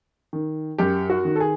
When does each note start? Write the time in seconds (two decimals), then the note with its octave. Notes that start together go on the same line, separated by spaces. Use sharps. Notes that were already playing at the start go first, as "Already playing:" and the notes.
0.33 D#3
0.78 F#2 G4
1.10 F#4
1.25 D#3
1.35 A4
1.40 G#4